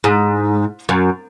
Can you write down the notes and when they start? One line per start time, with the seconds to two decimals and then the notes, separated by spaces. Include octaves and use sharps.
0.04 G#2
0.89 F#2